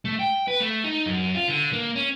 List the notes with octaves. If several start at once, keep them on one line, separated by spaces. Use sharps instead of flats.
A3
G5
B4
A3
D#4
F#2
F4
D3
A#3
C#4